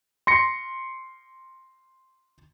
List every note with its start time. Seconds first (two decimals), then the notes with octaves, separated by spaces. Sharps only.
0.27 C6 A#6 C#7